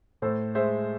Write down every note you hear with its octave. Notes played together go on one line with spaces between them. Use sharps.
A2 A4 C5
G#3 C5 E5